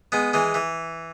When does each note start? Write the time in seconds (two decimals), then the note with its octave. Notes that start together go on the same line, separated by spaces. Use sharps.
0.12 G#3 B3
0.33 E3 G#3
0.54 E3